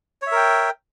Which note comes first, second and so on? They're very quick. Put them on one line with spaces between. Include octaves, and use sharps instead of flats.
C#5 E5 A#4 G5